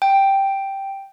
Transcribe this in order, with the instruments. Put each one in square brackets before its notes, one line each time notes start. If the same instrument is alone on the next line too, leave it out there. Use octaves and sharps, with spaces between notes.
[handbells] G5